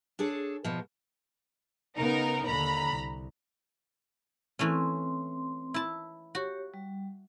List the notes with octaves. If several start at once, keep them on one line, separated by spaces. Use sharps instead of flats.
D4 G#4 A4 C#5
E2 B2 F3
C#3 B3 D#4 A#4
D#2 D3 A#5 B5
C2
E3 A3 C4 C#4 C6
E4 A5
F#4 G4 C#5
G3